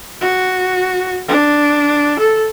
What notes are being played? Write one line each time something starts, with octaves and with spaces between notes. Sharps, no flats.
F#4
D4
A4